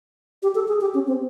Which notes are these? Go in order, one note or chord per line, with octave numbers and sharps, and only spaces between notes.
G4
A4
G#4
G4
C#4
C4